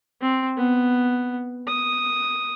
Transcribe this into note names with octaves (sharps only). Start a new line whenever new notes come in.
C4
B3
D#6